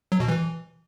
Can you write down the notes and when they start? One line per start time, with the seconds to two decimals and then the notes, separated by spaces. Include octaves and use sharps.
0.12 F#3
0.20 B2
0.28 E3